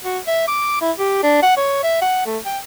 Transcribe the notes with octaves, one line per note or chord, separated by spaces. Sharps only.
F#4
E5
D6
E4
G4
D4
F#5
C#5
E5
F#5
A3
G5